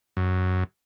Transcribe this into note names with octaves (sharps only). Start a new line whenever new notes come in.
F#2